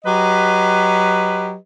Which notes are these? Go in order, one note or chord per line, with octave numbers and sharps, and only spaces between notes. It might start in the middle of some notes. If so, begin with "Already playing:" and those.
F#3 G4 B4 D#5